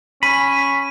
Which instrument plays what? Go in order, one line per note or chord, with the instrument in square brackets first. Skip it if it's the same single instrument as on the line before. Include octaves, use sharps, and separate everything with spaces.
[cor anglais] C#4 [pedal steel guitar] B5 [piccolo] B6 [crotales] D#7